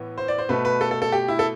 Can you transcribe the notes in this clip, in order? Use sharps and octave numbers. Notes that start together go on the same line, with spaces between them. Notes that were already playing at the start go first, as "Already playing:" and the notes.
Already playing: A2 E3 B3
C5
D5
C5
B2 A3 B4
B4
A4
A4
A4
G4
E4
A4